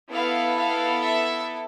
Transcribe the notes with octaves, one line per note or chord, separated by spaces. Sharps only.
B3 E4 A4 F5
F5
E5